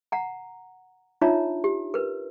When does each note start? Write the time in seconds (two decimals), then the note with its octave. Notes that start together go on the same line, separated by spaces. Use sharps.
0.12 F#5 A#5
1.21 D4 D#4 F4 C#5 E5 A#5
1.64 G4
1.94 A#4 B4